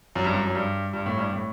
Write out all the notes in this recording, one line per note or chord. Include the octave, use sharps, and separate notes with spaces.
F#2
G2
F#2
F#2
G2
G2
A2
G2
A2